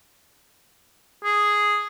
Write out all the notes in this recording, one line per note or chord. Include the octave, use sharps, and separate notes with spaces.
G#4